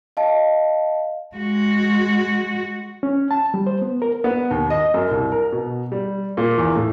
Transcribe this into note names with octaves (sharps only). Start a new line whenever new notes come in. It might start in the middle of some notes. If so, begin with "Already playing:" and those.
D#5 F5 A5
G#3 F#4
C#4
A5
G3
C5
B3
A#4
B3
D#2
D#5
F#2
C2
A#4
B2
G3
A#2
E2
A2